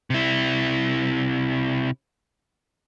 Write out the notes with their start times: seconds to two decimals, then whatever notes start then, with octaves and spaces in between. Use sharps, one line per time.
0.10 C3 E4